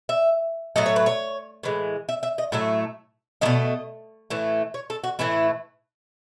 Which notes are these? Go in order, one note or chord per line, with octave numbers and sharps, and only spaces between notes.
E5
A2 F#3 A3 D#5
C#5
B4
C#5
A2 E3 G#3
E5
E5
D#5
A2 F#3 A3 E5
B2 F#3 A3 D#5
A2 E3 A3
C#5
A4
F#4
A2 E3 A3 E4